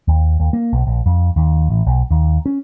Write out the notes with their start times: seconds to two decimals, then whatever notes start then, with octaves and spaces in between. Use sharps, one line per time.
0.08 D#2
0.40 D#2
0.53 A#3
0.73 B1
0.87 A#1
1.06 F2
1.36 D#2
1.70 A1
1.87 B1
2.11 D#2
2.46 C#4